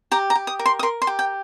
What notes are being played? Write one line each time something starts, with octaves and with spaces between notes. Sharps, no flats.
G4 A#5
A#5
G4
D#6
A#4
C6
D#6
A#4 C6
C6
G4
G5